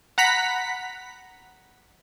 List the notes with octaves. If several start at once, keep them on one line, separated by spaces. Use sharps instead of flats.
F#5 A#5 B5 B6